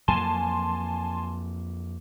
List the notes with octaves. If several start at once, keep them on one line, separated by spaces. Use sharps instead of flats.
F2 F#3 A#3 G#5 A5 C6